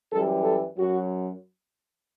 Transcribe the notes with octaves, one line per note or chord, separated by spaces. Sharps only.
F#2 E3 G3 A4
A4
F#2 F#3 F#4